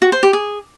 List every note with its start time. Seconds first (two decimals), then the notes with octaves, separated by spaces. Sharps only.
0.02 F#4
0.12 C5
0.23 G4
0.33 G#4